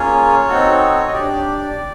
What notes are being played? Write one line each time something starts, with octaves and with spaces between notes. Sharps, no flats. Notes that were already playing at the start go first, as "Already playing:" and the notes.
Already playing: A#3 C#4 F4 G#4 C#5
C4 D#4 F#4 A4
D#5
D4 G4 D5